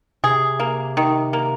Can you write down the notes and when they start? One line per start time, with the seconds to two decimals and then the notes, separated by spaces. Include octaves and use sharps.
0.24 C3 G#4
0.60 A#3
0.97 D#3
1.33 A#3